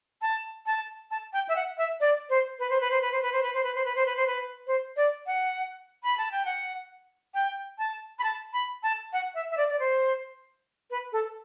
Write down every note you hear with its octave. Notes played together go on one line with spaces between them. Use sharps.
A5
A5
A5
G5
E5
F#5
E5
D5
C5
B4
C5
B4
C5
B4
C5
B4
C5
B4
C5
B4
C5
B4
C5
B4
C5
B4
C5
D5
F#5
B5
A5
G5
F#5
G5
A5
B5
A5
B5
A5
F#5
E5
E5
D5
D5
C5
B4
A4